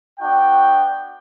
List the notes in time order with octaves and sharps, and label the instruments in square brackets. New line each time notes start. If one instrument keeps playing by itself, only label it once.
[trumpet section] B3 D4 F#4 G5